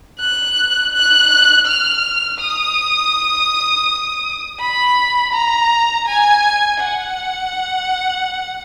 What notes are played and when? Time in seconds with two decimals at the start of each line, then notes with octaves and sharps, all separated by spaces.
0.20 F#6
0.93 F#6
1.66 F6
2.40 D#6
4.60 B5
5.34 A#5
6.08 G#5
6.80 F#5